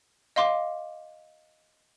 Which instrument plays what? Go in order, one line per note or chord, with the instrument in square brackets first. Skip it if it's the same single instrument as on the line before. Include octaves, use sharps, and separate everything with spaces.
[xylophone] D#5 F5 C6 D6